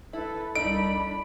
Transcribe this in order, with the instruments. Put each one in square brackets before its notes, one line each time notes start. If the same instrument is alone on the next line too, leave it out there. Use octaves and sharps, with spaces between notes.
[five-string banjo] E4 [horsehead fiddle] A4 B4
[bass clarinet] C2 [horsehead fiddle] D4 B5 [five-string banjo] D#4 A4 D#5 [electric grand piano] D7